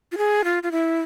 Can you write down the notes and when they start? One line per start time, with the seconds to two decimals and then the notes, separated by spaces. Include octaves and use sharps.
0.12 F4
0.18 G#4
0.44 F4
0.63 F4
0.72 E4